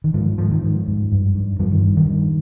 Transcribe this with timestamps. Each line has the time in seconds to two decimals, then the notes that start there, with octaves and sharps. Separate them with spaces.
0.04 D#3
0.14 G#2 F3
0.38 G#2 F3
0.51 D#3
0.63 G#2 F3
0.88 G#2
1.12 G2
1.35 G2
1.59 G2 F3
1.72 D#3
1.83 G2
1.97 D#3
2.07 G2